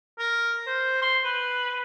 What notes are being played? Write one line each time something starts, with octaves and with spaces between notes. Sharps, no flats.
A#4
C5
C6
B4